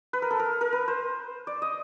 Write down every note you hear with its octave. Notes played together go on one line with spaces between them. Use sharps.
B4
A#4
A4
A#4
A#4
B4
C5
D5
D#5